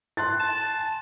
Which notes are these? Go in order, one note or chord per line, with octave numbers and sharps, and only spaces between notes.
C6 F#6 A6
A5